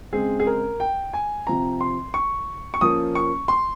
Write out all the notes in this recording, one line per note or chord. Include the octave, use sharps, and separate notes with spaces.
C#3 G#3 C4 G#4
G#4
A#4
G5
G#5
C3 F3 C4 A#5
C6
C#6
C#6
F3 A#3 C#4 D#6
C#6
C6